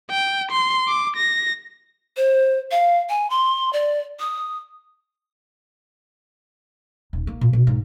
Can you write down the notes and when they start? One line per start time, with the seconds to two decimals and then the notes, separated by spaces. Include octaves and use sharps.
0.11 G5
0.52 C6
0.88 D6
1.17 A#6
2.17 C5
2.71 F5
3.09 G#5
3.30 C6
3.73 D5
4.20 D#6
7.13 D#1
7.27 A#3
7.41 A#2
7.53 B2
7.67 G#2